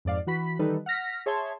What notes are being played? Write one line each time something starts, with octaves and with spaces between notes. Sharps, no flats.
F2 G#2 D5 F5
E3 F#4 B5 B6
D#3 E3 G3 D#4 A4 B4
F#5 F6 A#6 B6
G#4 C#5 E5 A5 C6 G#6